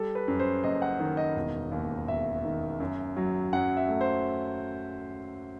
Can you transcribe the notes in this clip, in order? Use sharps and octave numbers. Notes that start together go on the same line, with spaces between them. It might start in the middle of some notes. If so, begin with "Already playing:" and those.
Already playing: G3 A4
B4
F#2
C5
F#1 D#5
F#5
D#3
D#5
E1
D#2
E1 E5
D#3
F#2
F#3
F#2 F#5
E5
A3
C5